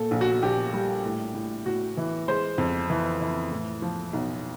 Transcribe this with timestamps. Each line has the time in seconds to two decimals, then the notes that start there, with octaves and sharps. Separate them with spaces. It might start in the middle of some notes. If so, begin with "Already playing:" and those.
Already playing: A#2 A4
0.11 A#1
0.21 F#4
0.43 A#1 G4
0.73 G3
1.05 A2
1.34 A2
1.66 A2 F#4
1.97 E3
2.28 G#3 C5
2.58 F2
2.90 E3
3.21 E3
3.51 A2
3.82 F3
4.13 B1